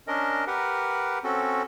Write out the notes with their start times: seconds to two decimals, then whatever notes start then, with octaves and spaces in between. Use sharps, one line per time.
0.07 C#4 D4 A#4 D#5
0.47 G4 A#4 B4 F#5
1.24 C4 C#4 F#4 A4